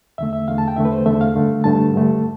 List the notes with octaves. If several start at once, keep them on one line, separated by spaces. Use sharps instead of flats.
E2 D3 A3 E5
E5
E2 D3 A3 F5
A5
G5
E2 D3 A3 E5
B4
C5
E2 D3 A3 E5
F5
G2 D3 A3
G2 D3 A3 A5
G2 D3 A3